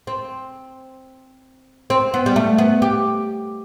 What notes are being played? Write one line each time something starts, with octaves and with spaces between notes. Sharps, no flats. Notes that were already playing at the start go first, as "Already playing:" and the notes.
C4
C4
B3
G3
A3
B3
G4